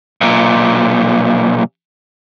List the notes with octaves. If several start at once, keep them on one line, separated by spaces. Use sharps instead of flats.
B1 A#2